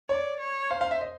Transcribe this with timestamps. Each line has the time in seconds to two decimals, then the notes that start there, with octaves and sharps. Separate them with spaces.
0.09 C#5 D5
0.40 C#5
0.70 C5 F5
0.81 F5
0.91 E5
1.01 D#5